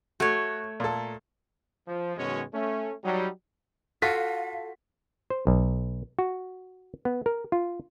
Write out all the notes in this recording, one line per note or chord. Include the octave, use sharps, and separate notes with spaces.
A3 F#4 C#5
A#2 A4
F3
F#2 B2 D#3 G#3 C#4 C#5
A3 C#4
F#3 G3 D#4
F4 F#4 A4 F5 B6
C5
B1
F#4
B3
A#4
F4